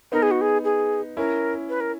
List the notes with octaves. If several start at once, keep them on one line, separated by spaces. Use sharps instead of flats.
B3 D#4 A#4
G#4
F#4
G#4
G#4
C#4 E4 A#4
B4
A#4